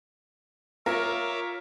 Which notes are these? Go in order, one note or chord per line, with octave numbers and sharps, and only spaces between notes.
F4 A#4 C#5 E5 D6